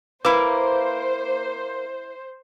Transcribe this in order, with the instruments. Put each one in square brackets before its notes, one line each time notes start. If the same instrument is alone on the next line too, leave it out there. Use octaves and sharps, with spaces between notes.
[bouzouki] A#3 [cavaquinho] E4 D6 [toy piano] B4 [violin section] C5